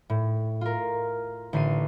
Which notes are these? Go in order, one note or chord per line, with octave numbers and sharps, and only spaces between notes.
A2
F4 A#4
A1 D3 D4 C7 D#7